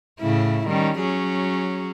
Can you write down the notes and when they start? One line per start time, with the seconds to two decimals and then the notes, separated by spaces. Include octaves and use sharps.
0.20 A2 C#3 E4
0.67 D#3 G3 C#4
1.00 F#3 C#4 G#4